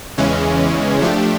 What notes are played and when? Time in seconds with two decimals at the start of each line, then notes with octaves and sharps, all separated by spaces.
0.18 E2 C#3 E3 G#3 C#4
1.02 F3 A3 D4 G4